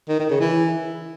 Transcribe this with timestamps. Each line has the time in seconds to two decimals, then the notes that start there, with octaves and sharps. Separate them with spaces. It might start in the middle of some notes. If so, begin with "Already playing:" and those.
0.09 D#3
0.19 D#3
0.30 C#3
0.40 E3